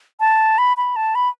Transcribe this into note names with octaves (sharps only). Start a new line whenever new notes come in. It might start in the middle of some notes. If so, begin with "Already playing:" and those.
A5
B5
B5
A5
B5